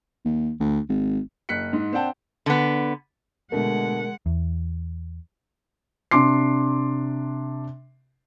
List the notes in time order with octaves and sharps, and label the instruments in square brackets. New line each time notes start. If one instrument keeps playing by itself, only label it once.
[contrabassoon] D#2
D2
G#1
[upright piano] F#1 F#6 B6 C#7
G#2
C4 D4 F#5 G5 A5
[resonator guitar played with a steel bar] D3 B3
[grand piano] B2 D3 A3 [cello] G#3 F#5 [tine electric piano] A#4
[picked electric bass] E2
[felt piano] C3 D4 C6 D6 C7